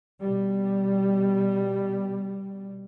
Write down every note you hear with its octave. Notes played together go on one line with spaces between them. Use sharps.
B2 G3